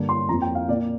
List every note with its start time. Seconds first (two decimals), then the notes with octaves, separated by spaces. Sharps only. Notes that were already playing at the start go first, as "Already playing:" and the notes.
Already playing: G2 D3 A#3
0.09 C6
0.28 F2 F3 A#3 A#5
0.42 G5
0.55 F5
0.68 A#2 D5
0.72 A#3